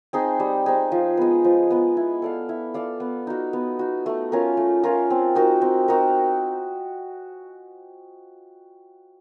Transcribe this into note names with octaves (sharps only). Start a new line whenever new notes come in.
C4 D#4 G#4
G3
C4 D#4 G#4
F3
G#3 B3
F3
G#3 B3
E4
A4 D5 F5
E4
A4 D5 F5
B3
D#4 F#4
B3
D#4 F#4
A3
C#4 F4 A#4
A3
C#4 F4 A#4
C4
D#4 F#4 A#4
C4
D#4 F#4 A#4